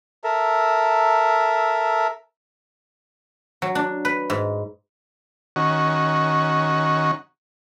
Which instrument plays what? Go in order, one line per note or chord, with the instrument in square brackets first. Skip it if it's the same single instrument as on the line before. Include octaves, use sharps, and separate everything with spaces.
[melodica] A4 A#4 E5
[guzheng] F#3
D4
B4
G#2
[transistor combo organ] D#3 C#4 F#4